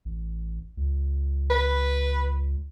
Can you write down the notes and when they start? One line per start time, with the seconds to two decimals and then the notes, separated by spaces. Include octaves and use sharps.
0.05 A1
0.77 C#2
1.50 B4